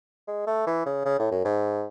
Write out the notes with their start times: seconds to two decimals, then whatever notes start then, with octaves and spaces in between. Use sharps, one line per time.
0.27 G#3
0.47 A3
0.67 E3
0.86 C#3
1.05 C#3
1.19 A2
1.31 F#2
1.44 G#2